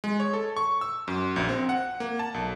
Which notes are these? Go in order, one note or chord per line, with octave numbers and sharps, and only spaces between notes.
G#3
C#5
A4
C#6
E6
F#2
A#1
C4
F#5
A#3
A5
B1